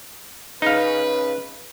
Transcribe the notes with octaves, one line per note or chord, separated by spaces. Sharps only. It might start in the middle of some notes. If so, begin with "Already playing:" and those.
C#3 D#4 B4 F5